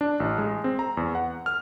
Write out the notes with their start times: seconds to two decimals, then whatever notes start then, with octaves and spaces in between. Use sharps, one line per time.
0.01 D4
0.20 A1
0.38 G#3
0.64 C4
0.79 A#5
0.97 E2
1.15 F#5
1.46 F6